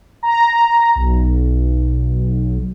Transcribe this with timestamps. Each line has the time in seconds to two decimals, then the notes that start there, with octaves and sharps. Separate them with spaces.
0.23 A#5
0.95 B1